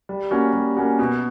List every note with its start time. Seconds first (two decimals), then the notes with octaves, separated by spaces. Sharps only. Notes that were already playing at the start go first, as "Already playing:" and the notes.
0.09 G3
0.31 A#3 C#4 F#4
0.53 G3
0.77 A#3 C#4 F#4
0.99 B2